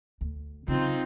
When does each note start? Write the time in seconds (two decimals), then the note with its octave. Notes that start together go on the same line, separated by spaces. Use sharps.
0.21 D2
0.68 C#3 F#3 C4 D#4 F4